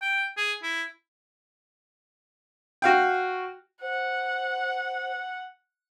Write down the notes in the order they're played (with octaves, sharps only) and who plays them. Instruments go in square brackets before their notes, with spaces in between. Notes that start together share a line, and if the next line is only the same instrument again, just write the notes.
[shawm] G5
G#4
E4
[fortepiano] F#4 F5 G5
[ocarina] C5 [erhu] F#5